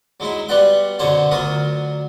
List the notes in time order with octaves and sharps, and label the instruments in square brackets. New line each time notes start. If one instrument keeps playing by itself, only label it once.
[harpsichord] F#3 G#3 D#4 E4
G3 B3 F#4 D5 F#5 C6
F#2 B2 D3 F#3 C5 C#5
D2 F#3 F4 F#4 A#4 D#6